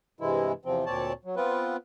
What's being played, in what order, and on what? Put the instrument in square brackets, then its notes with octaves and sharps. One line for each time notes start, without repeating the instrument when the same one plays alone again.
[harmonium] G2 C3 E3 G#3 E4
E2 C3 F3 C4
D2 A#2 C4 C#5 D5 A5
F#3
B3 C4 F4 B4